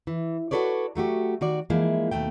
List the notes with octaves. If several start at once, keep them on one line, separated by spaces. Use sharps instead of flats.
E3
F#4 G#4 A4 B4 C#5 D5
F#3 A3 F#4 G4
D#3 F#4 D5
E3 F3 G#3 A#3 E4
D#2 B2 A3 G5